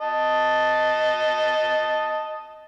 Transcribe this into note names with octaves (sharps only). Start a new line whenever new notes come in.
D#5 A5